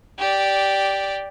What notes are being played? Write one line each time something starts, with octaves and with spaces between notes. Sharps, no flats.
G4 D5